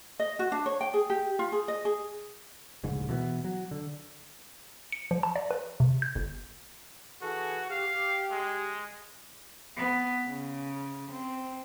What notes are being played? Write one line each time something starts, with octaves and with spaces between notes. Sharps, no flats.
D#5
F#4
D4
C#5
G5
G#4
G4
F4
G#4
D#5
G#4
D1 A#1 G#2 C#3
B2 E3 G3 B3
F#3
D3
C#7
F3
A5
D5
B4
C3
G6
G1
E3 F#4 G#4 A4
G4 F5
G#3
B3
C#3
C4